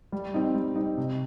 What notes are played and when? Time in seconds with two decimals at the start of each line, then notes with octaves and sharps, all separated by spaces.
0.12 G3
0.34 C4 D#4
0.55 G3
0.76 C4 D#4
0.97 C3